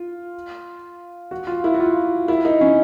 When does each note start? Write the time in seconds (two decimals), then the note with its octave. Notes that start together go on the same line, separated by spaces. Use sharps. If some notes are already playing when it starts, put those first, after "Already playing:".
Already playing: F4
1.31 F#4
1.47 F4
1.64 E4
1.74 F#4
1.80 F4
2.28 E4
2.45 D#4
2.61 C#4